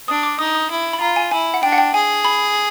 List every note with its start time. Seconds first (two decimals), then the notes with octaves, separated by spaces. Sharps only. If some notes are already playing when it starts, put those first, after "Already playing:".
0.08 D4 D#6
0.23 D6
0.39 D#4 D#6
0.55 D#6
0.71 E4
0.93 B5
1.00 F4 A#5
1.16 G#5
1.31 E4 G#5
1.54 F#5
1.63 D4 G5
1.72 F#5
1.78 G5
1.94 G#4 G#5
2.25 B5